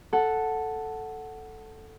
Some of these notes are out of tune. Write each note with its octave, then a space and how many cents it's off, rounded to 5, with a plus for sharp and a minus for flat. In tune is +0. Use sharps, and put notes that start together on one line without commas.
A4 +0 F#5 +0